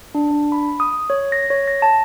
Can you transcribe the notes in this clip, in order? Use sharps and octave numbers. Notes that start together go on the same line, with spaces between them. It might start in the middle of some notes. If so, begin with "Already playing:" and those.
D4
D4
B5
D#6
C#5
A#6
C#5
A#6
A5